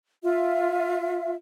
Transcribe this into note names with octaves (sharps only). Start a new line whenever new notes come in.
F4 E5